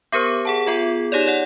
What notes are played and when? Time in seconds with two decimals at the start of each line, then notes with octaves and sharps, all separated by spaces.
0.12 B3 G4 A#4 C5 C#6
0.45 G#4 F#5 A5
0.66 B3 F4 G#4
1.12 D#4 G4 C#5 D5
1.26 C#5 D5 F#5